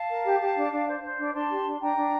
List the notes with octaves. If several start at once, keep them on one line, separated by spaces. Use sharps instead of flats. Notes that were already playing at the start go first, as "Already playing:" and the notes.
Already playing: F5 A5
A#4
G4
G4
D4
D4
C5
C5
D4
D4 A5 C6
G4
D4
D4 G5 A#5
D4